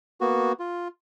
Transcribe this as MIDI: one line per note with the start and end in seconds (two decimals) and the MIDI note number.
0.21 0.52 58
0.21 0.52 59
0.21 0.52 66
0.59 0.88 65